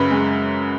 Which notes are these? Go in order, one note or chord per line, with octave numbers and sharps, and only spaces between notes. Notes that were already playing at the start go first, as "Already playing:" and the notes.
Already playing: F#2 C#3 B4
G#3